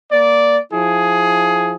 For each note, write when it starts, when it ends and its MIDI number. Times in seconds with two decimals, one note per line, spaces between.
0.11 0.58 58
0.11 0.58 74
0.72 1.75 53
0.72 1.75 64
0.72 1.75 68